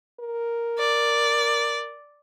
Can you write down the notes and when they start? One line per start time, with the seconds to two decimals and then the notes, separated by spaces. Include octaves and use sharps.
0.20 A#4
0.79 D5